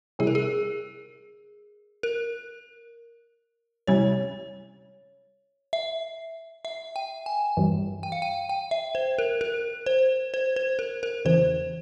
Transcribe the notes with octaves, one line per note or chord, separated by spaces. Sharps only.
C3 G3 C#4 E4 G#4
A#4
G#4
A#4
C3 G3 C#4 E4 C#5
E5
E5
G5
G#5
G2 E3 G3
G5
F5
G5
G5
E5
C5
A#4
A#4
C5
C5
C5
A#4
A#4
E2 C#3 E3 C5